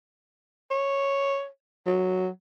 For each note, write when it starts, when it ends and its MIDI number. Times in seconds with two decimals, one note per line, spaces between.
0.71 1.46 73
1.86 2.28 54